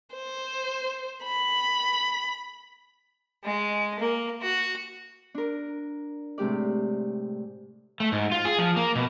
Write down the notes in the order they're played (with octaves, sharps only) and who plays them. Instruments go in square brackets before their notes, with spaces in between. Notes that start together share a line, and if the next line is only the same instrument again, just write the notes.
[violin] C5
B5
[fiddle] G#3
A#3
F#4
[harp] D4 A#4
A2 C3 G#3 G4 D5
[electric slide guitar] A3
G#2
F4
G#4
F3
A#3
B2